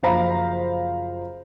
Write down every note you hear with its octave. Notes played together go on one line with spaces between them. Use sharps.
F#1 F3 C5 F5 A#5 B5